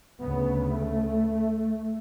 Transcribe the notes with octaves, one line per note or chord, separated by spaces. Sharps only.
D2 C#3 B3
A3